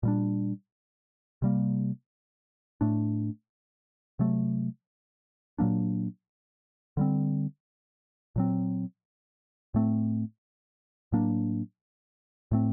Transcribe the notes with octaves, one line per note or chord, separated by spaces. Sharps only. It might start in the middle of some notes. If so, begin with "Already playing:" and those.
A#2 G3 D4
C3 G3 A#3
A2 A3 D4
C3 F#3 A3
A#2 F#3 A#3 D4
D3 G3 C4
A#2 F#3 C4
A2 A3 C4
A2 F#3 A#3 D4
A2 A3 C4